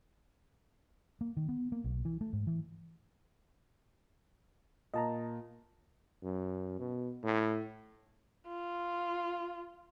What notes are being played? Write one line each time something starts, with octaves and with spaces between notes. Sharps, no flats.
A#3
D#3
B3
A#3
B1
E3
A3
G#2
E3
A#2 D#5 A5 A#5
F#2
B2
A2
F4